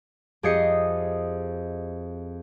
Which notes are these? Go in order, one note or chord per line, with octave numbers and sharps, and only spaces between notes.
F2 G4 G#4 D#5 C7 C#7